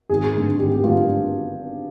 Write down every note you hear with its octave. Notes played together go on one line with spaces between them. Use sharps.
G#1 G#4
G2 D3
G#1 G4
G4
G2 D3 F4